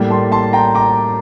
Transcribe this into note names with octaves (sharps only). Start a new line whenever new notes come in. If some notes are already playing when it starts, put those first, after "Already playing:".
Already playing: A2 G3 A#3
A5 C6
A5 C6
G5 A#5
A#5 D6